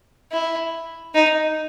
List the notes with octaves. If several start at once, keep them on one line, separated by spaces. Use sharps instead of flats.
E4
D#4